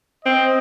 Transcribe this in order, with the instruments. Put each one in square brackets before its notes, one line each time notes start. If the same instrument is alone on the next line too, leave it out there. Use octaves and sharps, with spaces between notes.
[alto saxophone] C4 [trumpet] D#5